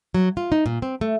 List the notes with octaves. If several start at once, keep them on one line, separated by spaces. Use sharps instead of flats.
F#3
F4
D#4
A#2
C4
A3